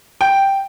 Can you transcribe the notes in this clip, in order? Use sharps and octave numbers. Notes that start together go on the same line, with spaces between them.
G5